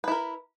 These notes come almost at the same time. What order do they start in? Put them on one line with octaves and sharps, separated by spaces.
B4 E4 A#4